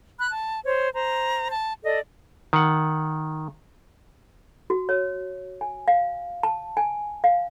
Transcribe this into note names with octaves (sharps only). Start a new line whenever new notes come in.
B5 F#6
A5
C5 C#5
C5 A#5
A5
A4 D5 D#5
D#3 F#5
F#4
C#5
G#5
F5
A5
G#5
F5